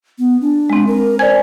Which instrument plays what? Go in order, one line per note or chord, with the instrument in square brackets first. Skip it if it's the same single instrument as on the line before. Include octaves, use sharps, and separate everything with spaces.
[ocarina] B3
D4
[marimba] G#3 C4
[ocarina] A#4
[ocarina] C5 [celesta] D5 G#5 [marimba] G#6